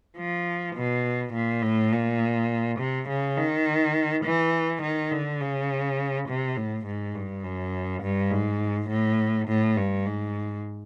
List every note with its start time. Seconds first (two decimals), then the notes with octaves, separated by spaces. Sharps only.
0.17 F3
0.75 B2
1.33 A#2
1.63 A2
1.92 A#2
2.79 C3
3.09 C#3
3.38 D#3
4.25 E3
4.83 D#3
5.12 D3
5.41 C#3
6.28 C3
6.57 A2
6.87 G#2
7.15 G2
7.44 F#2
8.03 G2
8.31 G#2
8.89 A2
9.48 A2
9.77 G2
10.06 G#2